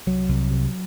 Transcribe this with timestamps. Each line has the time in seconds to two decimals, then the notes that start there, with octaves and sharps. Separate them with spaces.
0.07 C2 F#3
0.29 C2
0.51 C3